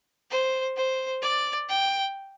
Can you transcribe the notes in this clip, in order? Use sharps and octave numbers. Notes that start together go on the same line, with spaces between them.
C5
C5
D5
G5